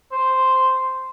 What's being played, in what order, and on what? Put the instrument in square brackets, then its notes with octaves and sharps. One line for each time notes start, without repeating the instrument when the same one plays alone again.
[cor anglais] C5